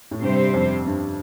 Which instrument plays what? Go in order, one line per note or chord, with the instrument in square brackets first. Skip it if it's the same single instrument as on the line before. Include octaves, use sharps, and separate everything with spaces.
[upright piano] A2
[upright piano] G2 [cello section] C3 G3 C4 G4 C5
[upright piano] F2
G2